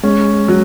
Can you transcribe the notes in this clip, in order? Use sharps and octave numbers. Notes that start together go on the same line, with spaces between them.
G#3 C#4
F#3